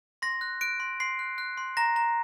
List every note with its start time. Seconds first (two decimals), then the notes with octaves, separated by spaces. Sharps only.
0.22 C6 A#6
0.41 F#6
0.61 F#6 D7
0.80 C6
1.00 C6 C7
1.19 F#6
1.38 F#6
1.58 C6
1.77 A#5 A#6
1.96 A#5